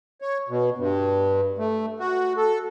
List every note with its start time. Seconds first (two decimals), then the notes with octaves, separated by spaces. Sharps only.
0.22 C#5
0.49 B2
0.77 G2
1.58 A3
2.00 F#4
2.37 A4